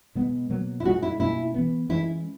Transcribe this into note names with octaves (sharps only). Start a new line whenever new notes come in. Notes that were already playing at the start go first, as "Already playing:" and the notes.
B2 G#3 B3
B2 F#3 A#3
E4
A#2 G#3 C#4 F#4
E4
B2 A#3 C#4 E4
E3 B3
E3 G#3 C#4 E4